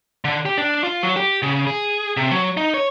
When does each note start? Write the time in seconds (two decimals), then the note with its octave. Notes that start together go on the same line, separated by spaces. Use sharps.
0.25 D3
0.45 G4
0.58 D4
0.84 F4
1.03 F#3
1.16 G4
1.42 C#3
1.67 G#4
2.17 C3
2.31 F#3
2.57 D#4
2.74 C#5